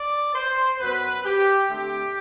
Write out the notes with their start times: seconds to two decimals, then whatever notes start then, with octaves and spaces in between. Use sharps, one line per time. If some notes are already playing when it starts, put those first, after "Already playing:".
Already playing: D5
0.35 C5
0.79 F#2 F#3 B3 B4
1.25 G4
1.70 D3 A3 C4 G4